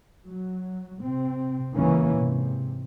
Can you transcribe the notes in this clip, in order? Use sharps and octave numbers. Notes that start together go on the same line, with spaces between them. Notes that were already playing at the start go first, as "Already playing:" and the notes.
F#3
C3 C4
C#2 C#3 E3 A#3 C#4
G#2 C3